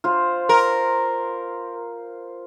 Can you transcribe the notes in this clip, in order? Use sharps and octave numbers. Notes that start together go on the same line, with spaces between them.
F4 C5
A#4